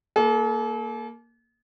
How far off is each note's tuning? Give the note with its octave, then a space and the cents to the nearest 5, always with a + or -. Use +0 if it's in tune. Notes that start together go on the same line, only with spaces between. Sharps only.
A#3 +0 A4 -45